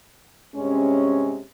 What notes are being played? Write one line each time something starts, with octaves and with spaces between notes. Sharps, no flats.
G2 C3 G#3 C#4